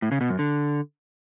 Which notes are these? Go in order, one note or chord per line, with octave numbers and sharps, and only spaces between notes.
A2
C#3
B2
F#2
D3